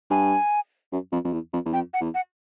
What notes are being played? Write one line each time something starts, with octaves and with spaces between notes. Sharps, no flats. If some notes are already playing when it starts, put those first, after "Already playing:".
G2 G#5
F#2
F2
F2
E2
F2
E2
F2 G5
F#5
E2
F#5